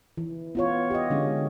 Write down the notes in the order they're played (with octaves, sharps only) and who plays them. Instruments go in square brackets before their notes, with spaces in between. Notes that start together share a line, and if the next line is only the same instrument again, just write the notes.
[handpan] E3
B3 F4 C#5
G4 D#5
D3 G#3 C#4